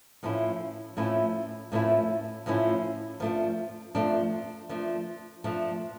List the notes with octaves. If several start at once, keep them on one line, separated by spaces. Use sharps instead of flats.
A2 F3 A3 C#4 E4
A2 F3 A3 C#4 E4
A2 F3 A3 C#4 E4
A2 F3 A3 C#4 E4
F3 A3 D4
F3 A3 D4
F3 A3 D4
F3 A3 D4